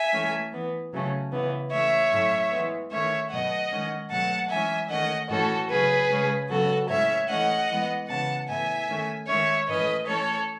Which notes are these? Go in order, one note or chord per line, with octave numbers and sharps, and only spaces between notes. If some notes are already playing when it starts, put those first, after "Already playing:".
Already playing: E5 G#5
E3 A3 C#4
E3 B3
C#3 F#3 A3 C#4
C#3 E3 B3
E3 A3 C#4 C#5 E5
A2 F#3 A3 C#4
E3 G#3 B3
D#3 A3 C#4 C#5 E5
B2 F#3 A3 D#5 F#5
D#3 G#3 C#4
B2 F#3 A3 F#5 A5
E3 G#3 C#4 E5 G#5
D#3 A3 C#4 D#5 F#5
A2 E3 A3 C#4 F#4 A4
C#3 F#3 C#4 G#4 B4
C#3 G#3 C#4
C#3 F#3 B3 F#4 A4
A2 G#3 C#4 C#5 E5
E3 A3 C#4 D#5 F#5
E3 G#3 B3
C#3 E3 B3 F#5 A5
A2 E3 B3 E5 G#5
D#3 A3 C#4
D#3 G#3 C#4 C#5 E5
A2 E3 A3 C#4 B4 D#5
E3 A3 C#4 A4 C#5